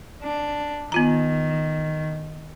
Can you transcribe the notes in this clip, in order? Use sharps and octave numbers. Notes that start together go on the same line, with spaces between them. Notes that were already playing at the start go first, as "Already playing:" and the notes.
D4
D#3 B3 F4 A#5